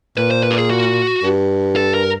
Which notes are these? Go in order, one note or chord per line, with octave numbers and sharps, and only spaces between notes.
A#2 B4
C5
B4
G4
G#4
F#4
G2
A4
A#4